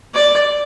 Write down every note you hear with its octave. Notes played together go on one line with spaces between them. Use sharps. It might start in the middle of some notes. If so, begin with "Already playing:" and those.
D5